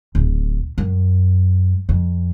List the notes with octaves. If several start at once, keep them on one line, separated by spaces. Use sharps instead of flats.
D1
F#2
F2